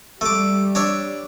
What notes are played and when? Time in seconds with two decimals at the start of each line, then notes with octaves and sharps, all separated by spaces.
0.21 G3 A3 D6
0.75 D4 C#5 E5